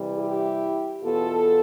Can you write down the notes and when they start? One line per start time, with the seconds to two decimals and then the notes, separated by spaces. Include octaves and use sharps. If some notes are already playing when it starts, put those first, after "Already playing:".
Already playing: C3 E3 G3
0.17 E4 G4
1.03 E2 B2 B3 F4 A4